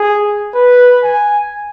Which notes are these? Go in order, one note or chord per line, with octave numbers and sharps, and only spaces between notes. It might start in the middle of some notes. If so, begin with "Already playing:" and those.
Already playing: G#4
B4
G#5